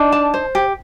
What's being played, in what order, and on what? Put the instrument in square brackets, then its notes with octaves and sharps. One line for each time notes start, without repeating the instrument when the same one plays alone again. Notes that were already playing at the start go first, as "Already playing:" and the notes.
Already playing: [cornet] D4 [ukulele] D#4
[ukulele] A5
C5
G4